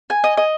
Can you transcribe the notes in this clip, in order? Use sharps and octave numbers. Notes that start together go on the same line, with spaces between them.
G#5
D#5
D#5